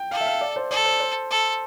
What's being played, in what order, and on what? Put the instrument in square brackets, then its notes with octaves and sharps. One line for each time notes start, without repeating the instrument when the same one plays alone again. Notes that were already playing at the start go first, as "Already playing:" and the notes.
Already playing: [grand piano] G5
[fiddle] A4 [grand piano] F5
[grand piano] E5
F5
D5
C5
[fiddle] A4 [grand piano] D5
[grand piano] C5
C5
[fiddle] A4